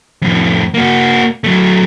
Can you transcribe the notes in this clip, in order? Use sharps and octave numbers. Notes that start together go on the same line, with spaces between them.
F2 A2
A#3 F#4
F#3 A3